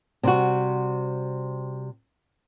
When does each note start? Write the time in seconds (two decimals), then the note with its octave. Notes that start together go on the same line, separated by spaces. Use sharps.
0.23 C3 G3 F#4